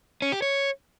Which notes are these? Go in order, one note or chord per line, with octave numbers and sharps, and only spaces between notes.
C#4
G4
C#5